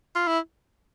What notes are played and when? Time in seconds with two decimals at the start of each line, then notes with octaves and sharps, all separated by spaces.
0.15 F4
0.27 E4